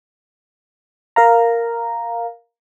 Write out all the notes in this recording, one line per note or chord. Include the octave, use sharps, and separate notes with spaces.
A#4 F5 A#5